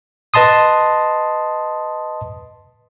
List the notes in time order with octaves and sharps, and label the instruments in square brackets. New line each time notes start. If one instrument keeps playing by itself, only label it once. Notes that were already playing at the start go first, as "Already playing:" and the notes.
[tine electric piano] B4 D#5 A5 C6 D#6